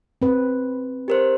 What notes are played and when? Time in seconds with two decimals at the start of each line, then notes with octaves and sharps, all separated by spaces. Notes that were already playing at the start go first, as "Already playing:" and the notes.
0.22 C4 B4
1.08 G4 A#4 C5